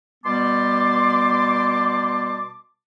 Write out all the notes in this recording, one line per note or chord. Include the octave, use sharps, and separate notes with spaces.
B2 G3 B3 A5 C6 D6